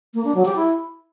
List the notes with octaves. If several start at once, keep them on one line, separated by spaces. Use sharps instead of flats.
A#3
D4
F#3
G4
E4